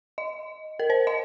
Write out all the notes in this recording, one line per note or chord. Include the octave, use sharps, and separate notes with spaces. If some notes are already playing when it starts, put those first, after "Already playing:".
D#5
A#4
C5
D#5